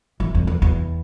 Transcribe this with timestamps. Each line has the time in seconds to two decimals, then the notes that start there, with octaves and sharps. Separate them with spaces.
0.20 E3
0.35 F2
0.47 E2
0.62 E2